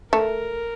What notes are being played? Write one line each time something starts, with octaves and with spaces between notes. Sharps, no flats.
A3 A#4